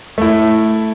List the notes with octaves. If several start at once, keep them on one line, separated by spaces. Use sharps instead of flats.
A3 E4